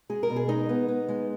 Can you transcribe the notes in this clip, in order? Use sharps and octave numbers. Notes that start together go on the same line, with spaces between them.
G#3 G#4
A#4
B2
G#4
G#3 D#4
B3
B3
G#3